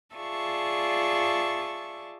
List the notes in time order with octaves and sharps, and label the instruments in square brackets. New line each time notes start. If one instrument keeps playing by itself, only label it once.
[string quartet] F4 G#4 D5 E5 A5 C#6